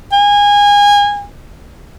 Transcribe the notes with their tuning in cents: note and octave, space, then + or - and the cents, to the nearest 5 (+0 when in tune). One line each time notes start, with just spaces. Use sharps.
G#5 -25